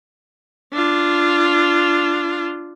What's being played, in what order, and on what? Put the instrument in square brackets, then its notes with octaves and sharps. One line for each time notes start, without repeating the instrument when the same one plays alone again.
[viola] D4 F4